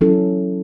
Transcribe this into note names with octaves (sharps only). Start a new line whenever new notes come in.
F#3 C#4 E4 A4